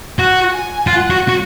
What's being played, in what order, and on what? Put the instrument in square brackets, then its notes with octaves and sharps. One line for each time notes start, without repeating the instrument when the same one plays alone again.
[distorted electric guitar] F#4 [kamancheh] F#5
[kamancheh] G#5
[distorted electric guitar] F4 [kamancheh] F#5
[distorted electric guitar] F#4
F#4